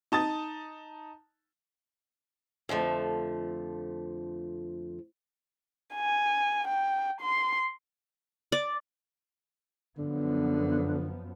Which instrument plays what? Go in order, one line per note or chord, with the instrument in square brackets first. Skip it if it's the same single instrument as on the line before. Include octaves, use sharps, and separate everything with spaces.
[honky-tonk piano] D#4 A5 D#6 A6
[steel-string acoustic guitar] F2 D3 F3 A3
[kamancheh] G#5
G5
C6
[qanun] D5
[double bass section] F#2 F3 B3 [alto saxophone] D3